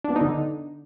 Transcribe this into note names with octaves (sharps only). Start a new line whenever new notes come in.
D4
B3
D#4
D3